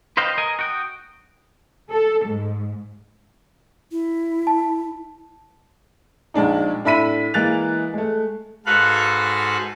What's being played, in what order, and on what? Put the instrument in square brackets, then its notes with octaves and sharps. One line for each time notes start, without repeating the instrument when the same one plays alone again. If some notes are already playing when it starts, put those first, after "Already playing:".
[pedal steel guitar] B4 C5 D#5 F5 G5
A#4 D#5 G#5
F#4 G5 D#6
[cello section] A4
G#2
[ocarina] E4
[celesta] A5
[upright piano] A#1 G#3 D4 D#4
A2 D4 E5 B5 B6 D#7
E3 G#3 A#3 F#6 A6 F7
G#3 A3
[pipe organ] G#2 F#4 A4 B4 F5 F#6